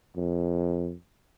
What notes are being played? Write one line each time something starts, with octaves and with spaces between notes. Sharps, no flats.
F2